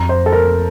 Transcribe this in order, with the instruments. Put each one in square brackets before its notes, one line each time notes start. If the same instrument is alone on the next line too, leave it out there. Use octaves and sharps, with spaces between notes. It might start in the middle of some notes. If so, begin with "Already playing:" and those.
Already playing: [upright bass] F2 [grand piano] A#5
[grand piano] C5
A4
A#4